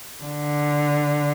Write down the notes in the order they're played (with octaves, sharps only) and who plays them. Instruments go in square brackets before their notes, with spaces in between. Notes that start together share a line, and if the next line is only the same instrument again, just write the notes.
[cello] D3